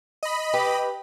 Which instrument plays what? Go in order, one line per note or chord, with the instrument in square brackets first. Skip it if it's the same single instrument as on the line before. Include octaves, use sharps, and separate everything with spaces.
[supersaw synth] D#5 B5
[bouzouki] G4 B4